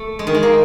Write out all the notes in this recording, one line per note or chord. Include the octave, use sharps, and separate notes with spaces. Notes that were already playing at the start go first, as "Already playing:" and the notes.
Already playing: A3
G#3
D#3
G#3
A#3